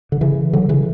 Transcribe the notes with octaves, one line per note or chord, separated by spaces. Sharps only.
D3
C#3 E3
D3 F#3
C#3 E3